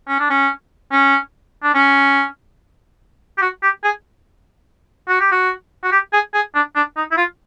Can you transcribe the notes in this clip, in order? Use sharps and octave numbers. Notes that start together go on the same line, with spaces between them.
C#4
D4
C#4
C#4
D4
C#4
G4
F#4
G4
G#4
F#4
G4
F#4
F#4
G4
G#4
G#4
D4
D4
D#4
E4
F4